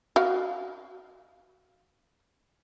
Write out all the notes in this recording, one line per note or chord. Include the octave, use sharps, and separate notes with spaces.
F#4 D#5 F5